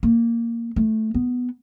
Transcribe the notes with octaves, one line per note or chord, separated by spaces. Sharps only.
A#3
A3
B3